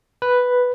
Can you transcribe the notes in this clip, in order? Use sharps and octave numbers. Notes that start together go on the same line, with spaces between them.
B4